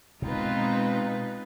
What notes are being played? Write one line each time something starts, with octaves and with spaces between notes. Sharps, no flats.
B2 G#3 C4 D#4 F4 B4